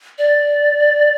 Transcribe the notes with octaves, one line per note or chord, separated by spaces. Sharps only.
D5